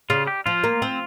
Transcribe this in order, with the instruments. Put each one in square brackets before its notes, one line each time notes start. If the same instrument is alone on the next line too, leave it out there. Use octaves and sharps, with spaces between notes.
[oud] C#3 [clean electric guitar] F4
[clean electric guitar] G4
[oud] F3 [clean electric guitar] F4
[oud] A#3
C4